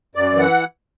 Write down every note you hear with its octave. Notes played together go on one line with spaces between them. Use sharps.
F#2 D5
E3
F#5